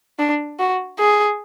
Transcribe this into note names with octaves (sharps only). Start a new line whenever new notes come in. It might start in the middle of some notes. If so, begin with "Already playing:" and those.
D4
F#4
G#4